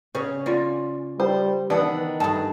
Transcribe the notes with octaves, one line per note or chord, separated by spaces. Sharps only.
C#3 G#4 C#5
A#3 C#4 F4 D5
G3 C5
D#3 E3 B3 D4 F#5
G2 A3 G#4 A5